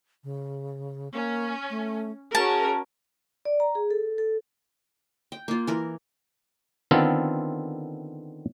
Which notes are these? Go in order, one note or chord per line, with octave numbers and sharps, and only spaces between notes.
C#3
A#3 C#4
A3
C#4 F#4 G#4 A#4 A5
D5
A#5
G#4
A4
A4
G5
A#3 F4
E3 A#4
D3 D#3 B3 C4 F4 A4